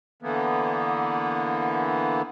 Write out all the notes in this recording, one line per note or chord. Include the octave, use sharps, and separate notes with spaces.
D3 E3 A#3 B3